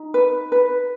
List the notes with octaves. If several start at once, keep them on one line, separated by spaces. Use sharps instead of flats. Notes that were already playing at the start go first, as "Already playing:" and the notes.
Already playing: D#4
B4
B4